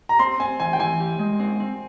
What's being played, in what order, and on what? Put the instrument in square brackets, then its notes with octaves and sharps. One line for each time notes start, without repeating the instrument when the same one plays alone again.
[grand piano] A#5
[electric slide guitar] C4 [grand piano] C6
[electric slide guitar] C4 [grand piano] G#5
[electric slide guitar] E3 [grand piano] G#5
[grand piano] G5
[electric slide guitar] E3 [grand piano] G#5
[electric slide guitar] G4
G#3
C4
C4